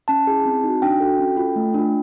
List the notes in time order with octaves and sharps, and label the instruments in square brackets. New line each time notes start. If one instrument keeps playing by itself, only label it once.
[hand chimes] C#4 A5
E4 G#4
C4
D#4 F#4
D4 G5
F#4 A4
C#4
F4 A4
A3
D4 F4